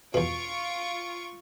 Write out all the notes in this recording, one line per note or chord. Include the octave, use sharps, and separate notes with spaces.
E2 B2 F4 C#6 D7